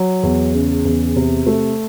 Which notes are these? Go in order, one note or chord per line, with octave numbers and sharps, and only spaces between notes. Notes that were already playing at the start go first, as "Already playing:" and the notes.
Already playing: F#3
E2
C#3
E2
C3
A3